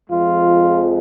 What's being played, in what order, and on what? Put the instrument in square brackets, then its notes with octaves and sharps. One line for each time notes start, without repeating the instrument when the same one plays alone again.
[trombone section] F2 F3 G#3 F4